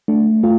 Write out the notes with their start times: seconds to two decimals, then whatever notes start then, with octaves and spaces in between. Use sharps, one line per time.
0.08 A3 D4
0.43 A3 F4